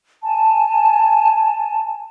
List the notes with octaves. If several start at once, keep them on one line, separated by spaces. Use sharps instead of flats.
G#5 A5